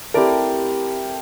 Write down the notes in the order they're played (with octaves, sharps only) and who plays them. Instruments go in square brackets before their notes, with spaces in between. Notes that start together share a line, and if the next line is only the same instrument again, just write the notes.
[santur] A3 C4 E4 G4 [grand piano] A#4 D5